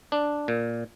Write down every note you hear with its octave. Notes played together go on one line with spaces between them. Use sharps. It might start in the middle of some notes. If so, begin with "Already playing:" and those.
D4
A#2